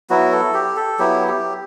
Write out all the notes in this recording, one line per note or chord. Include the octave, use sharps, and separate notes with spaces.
F#3 B3 E4 F#4
A4
G4
A4
F#3 B3 E4 G4
G4